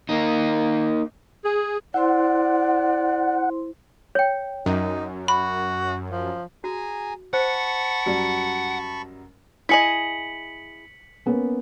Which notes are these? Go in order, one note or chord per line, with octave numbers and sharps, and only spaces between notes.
A#3 D#4
G#4
E4 C5 D5 F#5 C6
C#5 G5
F#2 D#4
F#4 B5
F3
F#4 G#4 G#5 A#5
C5 F#5 A5 B5 C#6
F#2 F#3 G3
E4 G#4 D#5 B6 C#7 F#7
A#3 B3 C#4